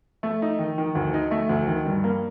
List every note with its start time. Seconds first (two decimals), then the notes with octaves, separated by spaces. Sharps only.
0.23 A3
0.42 D#4
0.59 D#3
0.78 D#3
0.95 D2
1.14 D#4
1.31 A3
1.49 D2
1.67 D#3
1.85 G2
2.04 A#3